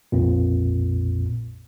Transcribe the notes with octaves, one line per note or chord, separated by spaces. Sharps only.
A#1 F2 A#2